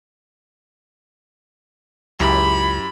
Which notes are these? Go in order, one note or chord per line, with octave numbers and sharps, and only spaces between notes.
C#2 F#2 E4 G4 B5